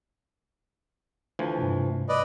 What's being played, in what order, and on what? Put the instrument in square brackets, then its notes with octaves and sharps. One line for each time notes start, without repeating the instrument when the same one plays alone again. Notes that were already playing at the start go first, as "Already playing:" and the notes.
[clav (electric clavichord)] D2 E3 F3
[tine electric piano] G2 C3
[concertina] B4 D5 D#5